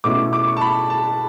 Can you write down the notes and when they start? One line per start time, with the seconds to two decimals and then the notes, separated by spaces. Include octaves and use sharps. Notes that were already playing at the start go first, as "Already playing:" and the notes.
0.04 B2 A3 C#4 E4 D6
0.33 D6
0.47 C#6
0.57 A5
0.61 B5
0.90 A5